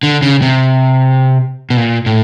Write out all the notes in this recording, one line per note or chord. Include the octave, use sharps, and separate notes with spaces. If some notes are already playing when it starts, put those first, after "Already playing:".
D3
C#3
C3
B2
A#2
A2